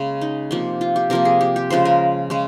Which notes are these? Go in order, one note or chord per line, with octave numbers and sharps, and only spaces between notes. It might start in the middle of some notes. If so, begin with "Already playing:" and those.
Already playing: C#3 G#3 A#3
D#4
C3 F3 A#3
F4
G4
C3 F3 A#3 A#4
G#4
G4
G4
C#3 F3 G#3 C5
A#4
C#3 G#3